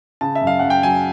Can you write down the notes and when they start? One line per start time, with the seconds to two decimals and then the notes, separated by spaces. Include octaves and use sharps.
0.21 C#3 A5
0.35 E5
0.41 F#2
0.47 F5
0.59 F#2 F#5
0.70 G5
0.83 F#3 G#5